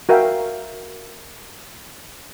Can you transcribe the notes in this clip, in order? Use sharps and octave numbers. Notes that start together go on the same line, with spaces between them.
F#4 A#4 E5 F5 G5